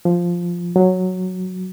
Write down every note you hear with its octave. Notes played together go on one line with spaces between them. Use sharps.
F3
F#3